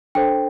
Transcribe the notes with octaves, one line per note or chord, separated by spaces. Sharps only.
D4 A4 C5 G5